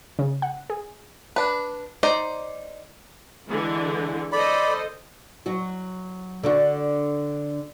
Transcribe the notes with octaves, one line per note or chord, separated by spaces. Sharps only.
C#3
F#5
G#4
D4 B4
D#4 C5 D5
D3 E3 G#3
A4 C5 D5 D#5 B5
F#3 F#4
D3 D4 F#4